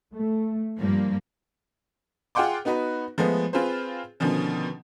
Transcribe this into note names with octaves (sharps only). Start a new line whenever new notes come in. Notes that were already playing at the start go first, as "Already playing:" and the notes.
A3
G2 F3 G3 A#3
F4 G#4 F#5 G5 C6 D6
B3 D#4 F#4 B4
F3 G#3 A3 B3
C4 F4 G#4 B4 C5
B2 D3 D#3 F3 C#4